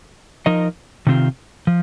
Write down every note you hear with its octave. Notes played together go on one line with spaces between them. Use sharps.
F3 D#4 A#4 D#5
C3 D#3 C4 F4
F3